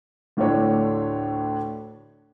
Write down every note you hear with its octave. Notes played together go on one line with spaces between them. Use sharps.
D2 A2 D3 A3 D4 C#5